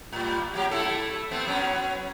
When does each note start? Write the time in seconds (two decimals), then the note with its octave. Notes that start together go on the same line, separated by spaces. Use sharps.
0.12 A2 G3
0.54 A#2 F#3 G4
0.71 A3 E4 A4
1.31 A3 B3 C4
1.46 F#3 B3 C#4